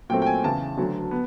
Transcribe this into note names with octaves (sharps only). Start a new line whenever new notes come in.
A#2 F#3 A3 C4 G5
G5
G#5
E2 C#3 E3 A5
D2 D3 F#3
B3